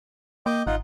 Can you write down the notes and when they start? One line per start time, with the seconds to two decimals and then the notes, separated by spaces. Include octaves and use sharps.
0.46 A#3 D#5 G5 D6
0.67 G#1 D#4 F4 F#5